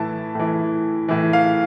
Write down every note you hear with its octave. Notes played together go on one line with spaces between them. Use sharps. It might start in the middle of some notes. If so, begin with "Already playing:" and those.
Already playing: A2 E3 A5
A2 E3
A2 E3
F5